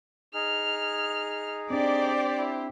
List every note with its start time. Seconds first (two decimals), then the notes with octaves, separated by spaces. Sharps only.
0.34 D#4 G#4 F6
1.70 C4 D4 G4 C5 D5
2.37 E4